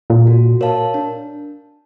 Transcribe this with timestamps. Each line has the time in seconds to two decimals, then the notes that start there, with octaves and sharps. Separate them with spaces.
0.10 A#2
0.27 F#4
0.61 A#4 C#5 F5 A5
0.94 D4